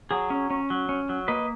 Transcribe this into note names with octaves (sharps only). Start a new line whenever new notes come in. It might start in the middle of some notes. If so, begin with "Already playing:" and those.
F#3 G#4
C#4
C#4
F#3
C#4
F#3
A#3 B4 D#5